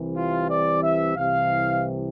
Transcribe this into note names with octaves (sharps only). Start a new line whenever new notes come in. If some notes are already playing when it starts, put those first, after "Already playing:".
Already playing: C2 C3 E3
F4
D5
E5
C2 C3 E3 F5